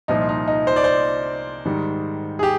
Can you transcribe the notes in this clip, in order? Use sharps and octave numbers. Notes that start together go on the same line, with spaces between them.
C2 A#2 F3 D#4
D#4
D#4
C5
D5
C5
G#2 D#3 G3
G#4
G4